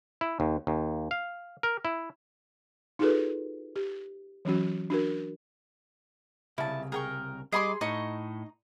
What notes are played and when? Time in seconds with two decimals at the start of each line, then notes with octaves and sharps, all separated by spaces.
0.21 E4
0.40 D#2
0.67 D#2
1.11 F5
1.63 A#4
1.85 E4
2.99 D#4 F4 F#4 G#4 A4 B4
3.76 G4
4.45 E3 F#3 C#4 F#4
4.90 D4 F#4 A#4
6.58 C2 C#3 E4 A5
6.92 G#4 A#4 G5 C#6
7.52 G3 G#4 D#5 B5 C6 D6
7.81 A2 D#4 D#5 C#6